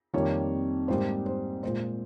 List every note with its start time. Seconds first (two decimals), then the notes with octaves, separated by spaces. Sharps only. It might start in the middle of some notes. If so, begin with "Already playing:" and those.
0.14 F2 D#3 G3 A#3 C#5
0.88 G#2 G3 A#3 C5
1.26 C5
1.63 A#2 G#3 C5